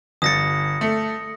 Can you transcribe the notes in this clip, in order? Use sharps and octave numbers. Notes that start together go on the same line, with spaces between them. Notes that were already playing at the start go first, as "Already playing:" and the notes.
G1 D#6 A6 A#6 C#7
A3